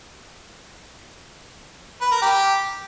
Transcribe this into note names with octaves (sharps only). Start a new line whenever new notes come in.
B4
A#4
G4